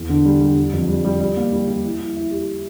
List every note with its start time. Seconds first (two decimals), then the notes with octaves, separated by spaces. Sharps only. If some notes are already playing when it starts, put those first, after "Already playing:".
Already playing: E2
0.09 D3
0.26 G3
0.41 G3
0.56 G3
0.73 F2
0.88 G3
1.04 G3
1.21 G3
1.37 A#3
1.53 G3
1.67 G3
1.84 E4
2.00 E4
2.16 E4
2.31 G4